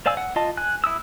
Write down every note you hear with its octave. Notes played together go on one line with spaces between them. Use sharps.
C5 D5 F5 G#5 E6
F#5
F4 D#5 A5
G#5 F#6
E4 D#6 E6